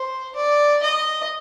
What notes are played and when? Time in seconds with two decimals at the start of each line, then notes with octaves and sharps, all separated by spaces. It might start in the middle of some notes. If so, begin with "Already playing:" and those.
Already playing: C5
0.36 D5
0.82 D#5